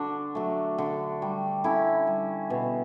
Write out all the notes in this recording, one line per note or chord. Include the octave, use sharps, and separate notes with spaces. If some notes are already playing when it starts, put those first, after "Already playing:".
Already playing: D3 D4 F#4
F#3 A3
D3
G3
D3 C#4 E4
G3
B2